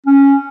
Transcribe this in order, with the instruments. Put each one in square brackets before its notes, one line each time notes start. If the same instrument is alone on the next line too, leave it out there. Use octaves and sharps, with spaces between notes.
[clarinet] C#4